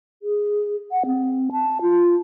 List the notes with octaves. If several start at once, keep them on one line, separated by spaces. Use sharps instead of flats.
G#4
F#5
C4
A5
F4